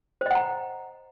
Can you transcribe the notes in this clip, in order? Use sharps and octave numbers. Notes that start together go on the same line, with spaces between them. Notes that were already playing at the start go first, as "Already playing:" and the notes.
C5 D#5 F#5 A#5